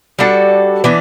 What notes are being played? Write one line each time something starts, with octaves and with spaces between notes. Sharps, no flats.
G3 D4 F#4 A4
E3 B3 D4